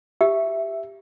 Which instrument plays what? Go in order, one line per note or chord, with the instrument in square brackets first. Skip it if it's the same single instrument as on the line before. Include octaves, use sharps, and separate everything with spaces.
[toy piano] G4 [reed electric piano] E5